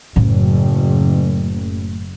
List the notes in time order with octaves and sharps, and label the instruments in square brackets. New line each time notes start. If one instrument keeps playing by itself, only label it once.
[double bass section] F#1 [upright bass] A2 C#3